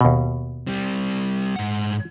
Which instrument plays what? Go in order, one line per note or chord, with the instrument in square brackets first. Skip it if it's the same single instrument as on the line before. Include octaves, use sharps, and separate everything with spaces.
[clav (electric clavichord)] D#2 B2
[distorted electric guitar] G3 C4
G#2 F#5